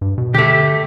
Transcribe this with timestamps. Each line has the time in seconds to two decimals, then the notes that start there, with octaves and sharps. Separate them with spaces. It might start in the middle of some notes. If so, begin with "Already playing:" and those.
0.01 G2
0.18 B2
0.34 D3 A3 G4